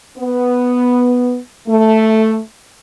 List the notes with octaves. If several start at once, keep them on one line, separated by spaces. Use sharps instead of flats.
B3
A3